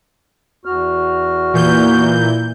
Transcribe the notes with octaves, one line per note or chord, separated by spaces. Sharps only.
E2 F#4 F6
A#2 E3 G6